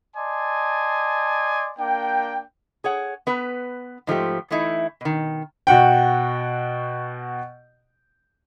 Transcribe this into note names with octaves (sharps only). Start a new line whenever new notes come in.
D5 D#5 G#5 A5 C6
A#3 D4 G5
G#4 C#5 F#5
B3 B4
G#2 F3 A3 G4
E3 A3 D#4 E4
B2 D#3
B2 F#4 F#5 G5